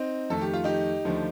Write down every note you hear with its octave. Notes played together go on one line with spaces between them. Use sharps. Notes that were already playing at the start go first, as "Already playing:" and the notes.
Already playing: C4 D#4
F2 D#3 A3 A4
G4
F4
D#4 G4
D#2 D3 F3 A3